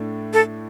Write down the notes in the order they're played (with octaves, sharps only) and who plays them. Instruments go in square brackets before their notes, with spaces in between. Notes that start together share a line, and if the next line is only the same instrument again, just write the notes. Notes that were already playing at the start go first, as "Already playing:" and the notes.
Already playing: [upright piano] A2 A3 D4
[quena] A4